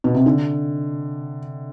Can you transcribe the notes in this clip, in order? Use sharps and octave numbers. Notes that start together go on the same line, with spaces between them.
B2
C3
D3